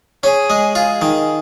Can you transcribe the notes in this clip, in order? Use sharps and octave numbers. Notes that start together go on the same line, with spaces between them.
C#4 G#4
G#3
F4 G#4
D#3